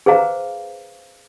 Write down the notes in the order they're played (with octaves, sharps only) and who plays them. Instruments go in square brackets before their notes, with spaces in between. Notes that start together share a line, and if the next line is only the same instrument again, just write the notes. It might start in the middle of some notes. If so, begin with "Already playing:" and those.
[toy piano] G#4 B4 C5 F5 A#5